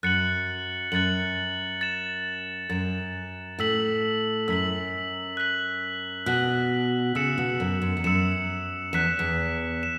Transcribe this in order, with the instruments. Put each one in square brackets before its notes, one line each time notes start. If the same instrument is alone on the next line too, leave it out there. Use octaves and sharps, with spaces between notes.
[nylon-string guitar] F#2 [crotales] F#6 A6 C#7 F#7
[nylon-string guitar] F#2 [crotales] F#6 A6 C#7 F#7
[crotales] A6 E7
[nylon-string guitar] F#2 [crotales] A6 E7
[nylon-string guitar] A2 [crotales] E6 B6 F#7
[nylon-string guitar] F#2 [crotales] E6 B6 F#7
[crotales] F#6 B6 F#7
[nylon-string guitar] B2 [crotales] F#6 B6 F#7
[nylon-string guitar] C#3 [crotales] E6 C#7 E7
[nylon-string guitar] B2
F#2
F#2
E2
[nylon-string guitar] F#2 [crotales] E6 C#7 E7
[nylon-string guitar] E2 [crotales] F#6 B6 E7
[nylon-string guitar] E2
[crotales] E7